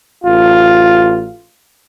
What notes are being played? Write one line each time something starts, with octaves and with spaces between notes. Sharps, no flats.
A1 F4